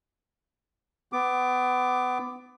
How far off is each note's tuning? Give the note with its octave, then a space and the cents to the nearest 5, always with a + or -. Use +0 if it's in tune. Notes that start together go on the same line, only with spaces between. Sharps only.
B3 +25 D6 +10